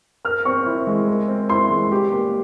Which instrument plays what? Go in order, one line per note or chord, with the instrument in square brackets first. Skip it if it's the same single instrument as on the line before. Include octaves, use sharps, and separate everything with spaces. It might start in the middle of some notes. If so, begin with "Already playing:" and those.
[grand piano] A#4 [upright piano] F6
[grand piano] C4 [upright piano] C#6
[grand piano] E4
G#3
A#4
C4
[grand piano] E4 [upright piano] C6
[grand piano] G#3
G4
A#3